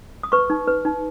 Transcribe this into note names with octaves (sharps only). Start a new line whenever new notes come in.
D#6
B4 C#6
D#4
B4
D#4